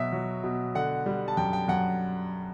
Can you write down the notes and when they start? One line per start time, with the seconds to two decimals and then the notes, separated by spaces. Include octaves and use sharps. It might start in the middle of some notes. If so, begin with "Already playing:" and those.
Already playing: B2 F#3 E5
0.12 F#3
0.43 B2
0.75 D3 F#5
1.06 G3
1.28 A5
1.37 F#2 G5
1.53 G5
1.68 F#2 F#5